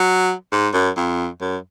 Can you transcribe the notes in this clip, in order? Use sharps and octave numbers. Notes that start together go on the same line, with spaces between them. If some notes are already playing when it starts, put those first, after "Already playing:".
Already playing: F#3
G#2
F#2
F2
F#2